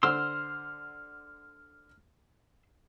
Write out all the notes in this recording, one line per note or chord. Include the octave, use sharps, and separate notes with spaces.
D3 C5 F#5 C6 E6 F6